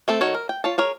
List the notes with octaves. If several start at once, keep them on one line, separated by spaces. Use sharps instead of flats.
A3 C4 A4
D#3 F#4 A4 C#5
A#4
G5
F4 C#5 A5
G#4 A#4 C#5